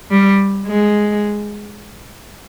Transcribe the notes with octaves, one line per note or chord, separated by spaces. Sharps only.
G3
G#3